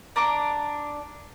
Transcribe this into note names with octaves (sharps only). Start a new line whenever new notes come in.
D4 A#5 D6